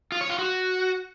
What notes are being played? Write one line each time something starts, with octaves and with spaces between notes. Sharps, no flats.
F4
C#5
F4
F#4